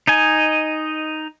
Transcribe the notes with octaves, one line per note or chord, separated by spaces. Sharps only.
D#4 D#5 G#5